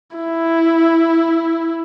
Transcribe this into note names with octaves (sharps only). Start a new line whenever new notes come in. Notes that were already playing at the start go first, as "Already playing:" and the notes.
E4